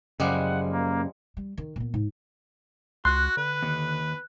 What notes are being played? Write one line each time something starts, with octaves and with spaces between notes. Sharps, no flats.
F#2 C#3 F3 G3 G#3 F#5
A#3
G3
D#3
A#2 B3
G#2
C#2 F#4 C6 F#6
D3 B4
D#2